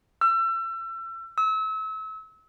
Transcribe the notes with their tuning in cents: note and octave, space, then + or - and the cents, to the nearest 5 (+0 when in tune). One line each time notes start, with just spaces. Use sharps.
E6 +35
E6 -35